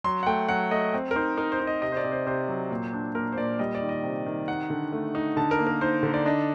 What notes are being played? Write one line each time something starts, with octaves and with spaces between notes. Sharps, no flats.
F#3 C6
F#5
A3 G5
F#3 F#5
A3 D#5
C4
A#4
D#4 C5
D#4 A#4
C5
D#4
D#5
C3 D#5
C5
D5
C3
C5
C3 C5
F#3
A#2
D4
A#2 A#4
C5
A#2 D5
G3 D#5
D5
D#3
D#5
C3
D#3
D#4 F#5
D3
A3
D#4
D3 A5
A#4
A#3
A#4
D#4 C5
D3
D5
D4 D#5